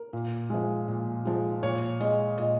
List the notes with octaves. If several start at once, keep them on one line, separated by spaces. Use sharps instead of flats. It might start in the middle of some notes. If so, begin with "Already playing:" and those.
Already playing: A#4
A#2
F3 G#3
A#2
F3 G#3
A#2 C#5
G#3 D#5
A#2 D#5